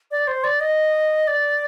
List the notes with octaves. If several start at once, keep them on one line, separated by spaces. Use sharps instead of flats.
D5
C5
D5
D#5
D5